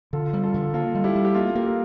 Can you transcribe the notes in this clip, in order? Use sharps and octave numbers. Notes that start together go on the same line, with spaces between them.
D3 F4 A4
G3
F4 A4
D3
A#3 F4 A4
G3
E4 G4
G3
G4
A#3 F4 A4
A#3 G4 A#4
A#4